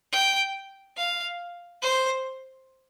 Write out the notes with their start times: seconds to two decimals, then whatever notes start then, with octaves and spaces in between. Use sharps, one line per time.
0.13 G5
0.97 F5
1.82 C5